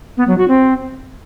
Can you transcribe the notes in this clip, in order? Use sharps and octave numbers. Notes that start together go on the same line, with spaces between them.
B3
F#3
F#4
C4